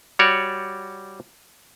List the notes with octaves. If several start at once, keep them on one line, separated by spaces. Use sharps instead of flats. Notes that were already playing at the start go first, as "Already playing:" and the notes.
G3 F#4 C#5 D5